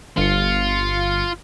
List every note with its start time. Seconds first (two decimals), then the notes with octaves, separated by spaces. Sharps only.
0.17 G1 F4 C#7